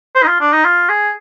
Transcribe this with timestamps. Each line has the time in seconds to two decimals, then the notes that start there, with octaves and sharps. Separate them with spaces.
0.15 C5
0.23 D#4
0.27 F4
0.41 D4
0.52 D#4
0.65 F4
0.89 G#4